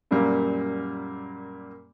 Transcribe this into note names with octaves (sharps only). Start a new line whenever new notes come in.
F#2 A#2 G3 A#3